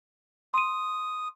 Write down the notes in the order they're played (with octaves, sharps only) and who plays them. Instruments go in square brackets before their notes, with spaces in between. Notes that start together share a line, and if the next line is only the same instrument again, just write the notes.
[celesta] C6 D#7 [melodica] D#6